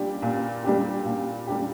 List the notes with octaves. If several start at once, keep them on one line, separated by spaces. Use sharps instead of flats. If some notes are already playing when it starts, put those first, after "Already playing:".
Already playing: A#2 G3 D4 G4
A#2
G3 D4 G4
A#2
G3 D4 G4